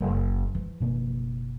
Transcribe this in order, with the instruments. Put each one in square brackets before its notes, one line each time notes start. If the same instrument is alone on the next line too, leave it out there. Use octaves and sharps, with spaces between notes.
[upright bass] F#1
E3 F3
[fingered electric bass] F#1 B2 A#3